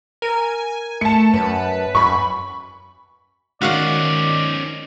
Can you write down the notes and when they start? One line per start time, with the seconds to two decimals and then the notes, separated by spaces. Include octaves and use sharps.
0.22 A#4 G#5
1.01 A3 A5 C#7
1.34 F#2 B4
1.95 F#2 B5 C#6
3.61 D#3 C#4 D#4 F#4 D5 F5 F#5